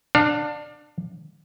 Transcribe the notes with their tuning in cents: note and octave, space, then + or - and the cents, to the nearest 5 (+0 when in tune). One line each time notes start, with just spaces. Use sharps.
D4 +20 F5 +35